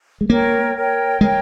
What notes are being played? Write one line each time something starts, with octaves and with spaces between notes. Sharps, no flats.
G#3
A#3 A#4 C#5 G5
A#4 C#5 G5
G#3 A#4 C#5 G5